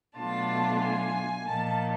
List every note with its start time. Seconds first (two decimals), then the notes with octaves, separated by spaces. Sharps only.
0.17 B2 F#3 A3 D4 F4 A5
0.82 G#5
1.47 A#2 F3 A#3 D#4 A5